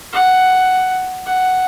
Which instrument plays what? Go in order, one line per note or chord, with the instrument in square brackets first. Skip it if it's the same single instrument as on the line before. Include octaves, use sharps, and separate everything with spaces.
[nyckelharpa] F#5
F#5